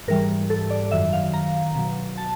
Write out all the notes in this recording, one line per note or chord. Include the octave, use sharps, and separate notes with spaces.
G#2 E3 G3 A#4
A4
D5
F#2 D#3 F#3 E5
F5
A#5
B2 F#3
A5